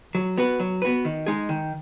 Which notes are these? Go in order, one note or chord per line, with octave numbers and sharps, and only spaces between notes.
F#3
B3 F#4 B4
F#3
B3 F#4 B4
D#3
G#3 D#4 G#4
D#3